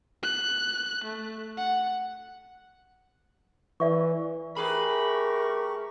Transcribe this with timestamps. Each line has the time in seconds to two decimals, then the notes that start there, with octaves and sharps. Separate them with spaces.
0.23 F#6
1.04 A3
1.57 F#5
3.80 E3 D5 E5 C#6
4.57 A3 G4 G#4 A#4 B4 B5 C#6